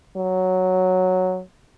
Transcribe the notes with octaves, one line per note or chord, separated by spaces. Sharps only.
F#3